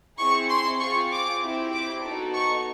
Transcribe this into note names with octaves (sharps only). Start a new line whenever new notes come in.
C4 E4 G#4 C#6
C6
C4 F4 G#4 C#6
D6
C4 E4 G4
D6
B3 D#4 F#4 A4
C#6